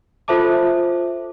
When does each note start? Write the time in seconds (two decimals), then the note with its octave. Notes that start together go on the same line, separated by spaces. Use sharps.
0.28 F4 A4 C5 E5 A5 D6